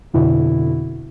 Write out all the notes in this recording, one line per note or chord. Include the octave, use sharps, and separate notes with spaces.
F2 B2 D3 E4 F#4